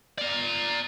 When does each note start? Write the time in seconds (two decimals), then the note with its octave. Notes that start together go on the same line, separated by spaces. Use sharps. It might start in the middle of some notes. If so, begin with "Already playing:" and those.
0.18 D5 A#5